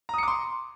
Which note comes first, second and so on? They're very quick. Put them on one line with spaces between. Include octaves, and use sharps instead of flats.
A#5 D#6 C#7 D6 C6